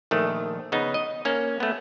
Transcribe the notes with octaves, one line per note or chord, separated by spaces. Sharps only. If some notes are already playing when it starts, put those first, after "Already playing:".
A#1 D#3 A3
C#3 B3 D#4
D#5
A#3 C#4
A3 B3